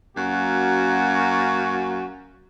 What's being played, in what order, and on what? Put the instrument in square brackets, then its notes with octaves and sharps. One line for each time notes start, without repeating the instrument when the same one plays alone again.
[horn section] F#2 A#3 F#4